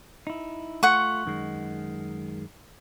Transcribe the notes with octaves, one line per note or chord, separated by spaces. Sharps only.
D#4 E4
A3 F4 F#5 C#6
F#2 D#3 G#3